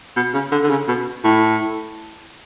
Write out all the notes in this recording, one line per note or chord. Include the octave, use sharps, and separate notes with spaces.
B2
C#3
D3
D3
C#3
B2
A2